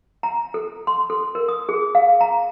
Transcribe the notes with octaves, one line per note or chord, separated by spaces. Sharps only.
A#5
A4
C6
A4
A#4
D#6
G#4
F5
A#5